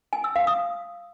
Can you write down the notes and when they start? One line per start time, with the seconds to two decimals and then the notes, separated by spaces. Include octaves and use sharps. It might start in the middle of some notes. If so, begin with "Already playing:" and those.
0.13 G#5
0.24 E6
0.36 F5
0.47 D#6